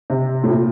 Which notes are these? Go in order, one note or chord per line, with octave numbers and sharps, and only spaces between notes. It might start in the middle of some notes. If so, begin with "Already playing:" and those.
C3
A2
A#2